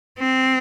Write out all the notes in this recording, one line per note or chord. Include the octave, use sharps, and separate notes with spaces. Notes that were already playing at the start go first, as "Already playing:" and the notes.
C4